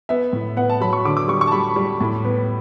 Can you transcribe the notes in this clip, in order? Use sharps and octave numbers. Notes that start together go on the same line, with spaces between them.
B3 E5
A2
B3 F#5
A5
F#3 B5
C#6
D3 D6
D6
G3 C#6
C#6
A5
G3 B5
G3
A2
B3